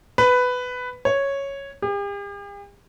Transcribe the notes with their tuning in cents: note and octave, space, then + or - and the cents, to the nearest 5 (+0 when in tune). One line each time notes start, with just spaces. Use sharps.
B4 +10
C#5 -5
G4 +45